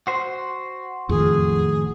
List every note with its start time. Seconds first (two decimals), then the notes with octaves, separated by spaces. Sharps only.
0.07 F#4 C5
1.09 F#1 F2 A2 D#3 G#4